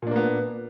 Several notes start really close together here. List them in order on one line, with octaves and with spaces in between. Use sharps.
A#2 D4 A#3 B3